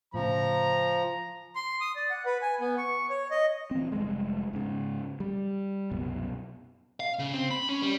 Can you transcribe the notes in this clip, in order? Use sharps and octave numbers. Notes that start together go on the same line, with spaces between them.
A2 C#3 F3 A#5
C6
D#6
D5
F#5
B4
G#5
B3
C#6
C#5
D#5
E3 C4
F1 F#2 G3 G#3
G#2 C#3
G3
C2 F#2 B2
F5
C#3
C4
B5
C#4
G3